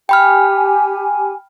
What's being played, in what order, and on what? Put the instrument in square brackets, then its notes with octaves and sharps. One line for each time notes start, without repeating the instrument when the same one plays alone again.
[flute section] G4 G#5 [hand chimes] G5 B5 F6